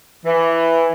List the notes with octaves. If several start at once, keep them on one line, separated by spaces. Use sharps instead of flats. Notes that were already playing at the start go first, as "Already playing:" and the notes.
E3